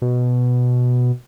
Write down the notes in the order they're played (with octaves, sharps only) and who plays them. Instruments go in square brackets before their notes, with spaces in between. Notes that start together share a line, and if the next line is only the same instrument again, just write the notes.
[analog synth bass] B2